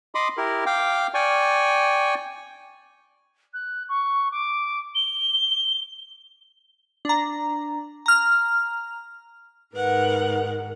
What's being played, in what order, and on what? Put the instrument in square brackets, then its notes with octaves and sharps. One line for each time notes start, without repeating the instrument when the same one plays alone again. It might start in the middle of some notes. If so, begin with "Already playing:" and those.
[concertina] D#5 B5 C6 D6 D#6
E4 G4 A#4
F5 G5 D6
D5 G5 G#5 C#6
[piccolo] F#6
C#6
D6
G7
[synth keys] D4 A#5
A#5 F6
[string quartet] G#2 D#3 [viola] A#4 F#5 [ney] B4